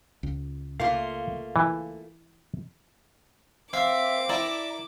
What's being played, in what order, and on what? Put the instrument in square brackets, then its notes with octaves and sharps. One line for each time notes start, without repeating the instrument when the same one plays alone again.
[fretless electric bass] C#2
[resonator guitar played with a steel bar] A3 A#3 F4 [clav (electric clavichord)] F5
[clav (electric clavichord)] E3
[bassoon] C4 [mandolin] E5 [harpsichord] F5 [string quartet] D6
[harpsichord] E4 [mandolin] D5 A5 A#5